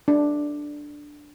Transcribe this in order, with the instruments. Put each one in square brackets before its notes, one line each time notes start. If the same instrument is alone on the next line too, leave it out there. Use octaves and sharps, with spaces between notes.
[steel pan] D4